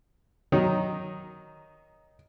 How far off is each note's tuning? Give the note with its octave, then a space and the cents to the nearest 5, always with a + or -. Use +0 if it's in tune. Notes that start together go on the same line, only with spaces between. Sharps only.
D#3 +5 F#3 +0 D#4 +0